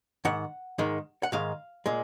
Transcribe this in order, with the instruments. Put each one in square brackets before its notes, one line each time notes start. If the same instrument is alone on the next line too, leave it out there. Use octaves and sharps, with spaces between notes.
[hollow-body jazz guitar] G#2 D#3 F#5
G#2 D#3 G#3
F#5
G#2 D#3 G#3 F5
A#2 G#3